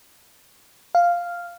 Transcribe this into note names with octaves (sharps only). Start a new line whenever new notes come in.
F5